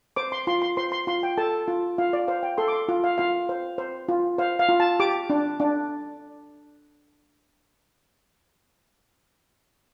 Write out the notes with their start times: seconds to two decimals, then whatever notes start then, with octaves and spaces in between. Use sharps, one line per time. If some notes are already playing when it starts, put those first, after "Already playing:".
0.16 C5 D6
0.32 C6
0.47 F4 C6
0.62 C6
0.77 C5 C6
0.92 C6
1.07 F4 C6
1.23 G5
1.37 A4 A5
1.68 F4
1.98 F4 F5
2.13 D5
2.28 C5 F5
2.43 G5
2.58 A4 C6
2.68 D6
2.73 C6
2.89 F4
3.04 F5
3.18 F4 F5
3.49 C5
3.78 C5
4.09 F4
4.38 C5 F5
4.59 F5
4.69 F4
4.80 A5
5.00 G4 D6
5.30 D4
5.60 D4